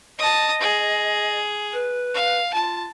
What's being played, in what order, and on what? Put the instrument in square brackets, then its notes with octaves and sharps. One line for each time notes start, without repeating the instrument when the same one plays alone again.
[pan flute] D#5 [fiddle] A5 D#6
[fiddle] G#4
[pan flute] B4
[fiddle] F5
[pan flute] F4 [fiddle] A5